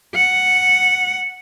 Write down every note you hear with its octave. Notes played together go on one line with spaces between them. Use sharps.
F#5